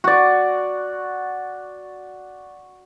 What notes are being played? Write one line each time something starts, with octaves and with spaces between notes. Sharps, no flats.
F#4 D5